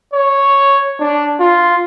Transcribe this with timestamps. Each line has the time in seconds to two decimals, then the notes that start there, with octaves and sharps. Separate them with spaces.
0.13 C#5
1.00 D4
1.40 F4